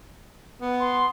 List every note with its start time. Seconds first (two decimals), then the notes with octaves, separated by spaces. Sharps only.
0.61 B3
0.80 C6